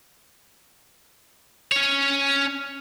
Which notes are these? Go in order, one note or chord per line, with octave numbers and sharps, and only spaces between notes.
C#4 C#5